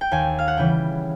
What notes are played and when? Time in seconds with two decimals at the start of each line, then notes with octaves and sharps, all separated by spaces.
0.01 G5
0.12 D#2 G#5
0.39 F5
0.48 F#5
0.57 C#3 E3 G3 G5